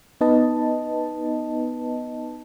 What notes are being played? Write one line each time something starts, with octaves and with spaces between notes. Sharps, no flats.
B3 D#4 B4 D#5 A5